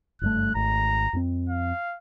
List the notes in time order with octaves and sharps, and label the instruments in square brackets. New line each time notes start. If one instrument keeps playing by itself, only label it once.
[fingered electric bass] F#1 G2 A3 [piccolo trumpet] F#6
[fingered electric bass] G#1 A3 [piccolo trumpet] A#5
[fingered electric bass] F2 A#3 C4
[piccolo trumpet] F5